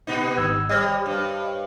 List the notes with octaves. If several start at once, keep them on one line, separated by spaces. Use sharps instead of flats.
A#2 B3 D#4
G#1 E6 G#6
G3 C5 C#5 D#5
G2